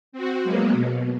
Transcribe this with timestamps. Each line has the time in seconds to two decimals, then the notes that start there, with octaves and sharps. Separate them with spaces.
0.12 C4 F#4
0.44 F#3 G#3 A#3 B3
0.72 B2